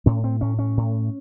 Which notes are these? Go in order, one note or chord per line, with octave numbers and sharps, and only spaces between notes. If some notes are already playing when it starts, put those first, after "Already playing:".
A2 C#4
C4
A2 C#4
C#4
A2